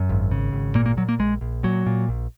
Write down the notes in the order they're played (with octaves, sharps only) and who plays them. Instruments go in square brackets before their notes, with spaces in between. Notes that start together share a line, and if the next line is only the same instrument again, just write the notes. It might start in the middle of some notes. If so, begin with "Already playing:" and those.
Already playing: [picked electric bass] F#2
G#1
C#3
G#1
A#2 A#3
A#3
A#2 F#3
A#3
A#1 G#3
A#1
A#2 F#3
A#2
A#1